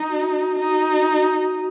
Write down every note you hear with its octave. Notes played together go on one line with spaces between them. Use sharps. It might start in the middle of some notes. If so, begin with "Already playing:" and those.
Already playing: D#4
F#4
D#4